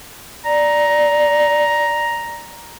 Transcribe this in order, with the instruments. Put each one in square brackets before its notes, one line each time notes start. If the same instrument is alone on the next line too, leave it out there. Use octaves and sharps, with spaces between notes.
[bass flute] D5 [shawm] A#5